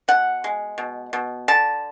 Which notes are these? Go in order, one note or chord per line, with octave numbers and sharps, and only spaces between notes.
B2 F#5
G#3
B2
B2
D3 A5